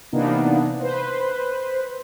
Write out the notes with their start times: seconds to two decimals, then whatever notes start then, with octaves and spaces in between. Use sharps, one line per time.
0.12 C3 E3 A#3 B3 D4 D#4
0.80 B4 C5